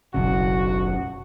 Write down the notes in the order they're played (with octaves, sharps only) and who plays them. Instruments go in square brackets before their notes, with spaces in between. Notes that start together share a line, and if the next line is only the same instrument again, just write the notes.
[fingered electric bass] F#1 B1 C#3 [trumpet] F#4